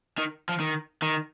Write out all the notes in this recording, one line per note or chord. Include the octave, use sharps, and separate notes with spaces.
D#3
F3
D#3
D#3